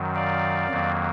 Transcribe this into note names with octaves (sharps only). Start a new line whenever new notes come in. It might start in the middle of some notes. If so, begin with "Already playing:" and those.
Already playing: F#2 D#3 F#3
D5 F5
F2 D#3 F#3 A#3